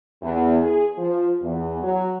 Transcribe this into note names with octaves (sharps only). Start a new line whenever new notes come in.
E2
G#4
F3
E2
F#3